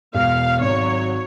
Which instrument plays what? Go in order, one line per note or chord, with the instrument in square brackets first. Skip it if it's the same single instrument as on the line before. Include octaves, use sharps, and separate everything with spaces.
[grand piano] E1 [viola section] F5
[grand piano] G#1 [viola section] F#3 C#5